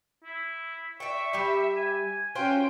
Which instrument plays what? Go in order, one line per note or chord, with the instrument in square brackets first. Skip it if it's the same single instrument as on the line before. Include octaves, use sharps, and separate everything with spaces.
[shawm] E4
[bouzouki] D5 G5 [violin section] E5 [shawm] C#6
[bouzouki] G3 G4
[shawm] G#5
[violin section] C#4 G5 [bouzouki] F4 F#4 C5